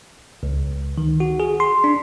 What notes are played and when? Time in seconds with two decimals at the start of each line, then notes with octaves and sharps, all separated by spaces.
0.43 C#2
0.98 D#3
1.20 F#4
1.40 G#4
1.60 C6
1.84 D4